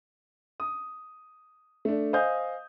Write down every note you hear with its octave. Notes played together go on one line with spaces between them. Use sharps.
D#6
A3 D4
C5 D#5 F5 G#5 D#6 G6